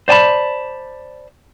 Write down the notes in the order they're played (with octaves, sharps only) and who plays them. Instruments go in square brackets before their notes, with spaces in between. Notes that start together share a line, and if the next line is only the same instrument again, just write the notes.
[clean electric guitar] C5 D5 G#5 A5 B5